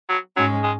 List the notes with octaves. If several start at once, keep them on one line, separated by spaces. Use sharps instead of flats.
F#3
G#2 F#3 G#3 C#4
G#3